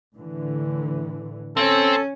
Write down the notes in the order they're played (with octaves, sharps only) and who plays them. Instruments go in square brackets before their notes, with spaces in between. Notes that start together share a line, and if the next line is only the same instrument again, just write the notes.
[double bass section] A2 D3 E3
[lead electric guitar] C4 [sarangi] C#4 [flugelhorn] A4